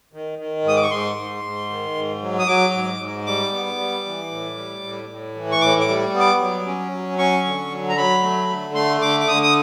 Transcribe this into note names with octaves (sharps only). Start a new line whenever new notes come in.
D#3
D#3
G#2 D#6
D6
C#6
G#2 C6
G#2
G#2
D#3
G#2
F#3
D#6
F#3 D6
G#2
G#2
G3 D6
B3
G3
E3
A2
G3
A2
A2
E3
C#6
A2 D6
D6
G3
B3
D6
F#3
C#4
F#3
C#4 C#6
D3
F#3
A#5
F#3 B5
A3
D3
A3 C6
D3 D6
D6
D3 D#6
D#6